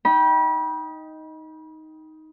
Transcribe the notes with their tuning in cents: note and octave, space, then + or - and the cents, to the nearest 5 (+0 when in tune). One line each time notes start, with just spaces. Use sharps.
D#4 +10 G5 +0 B5 -35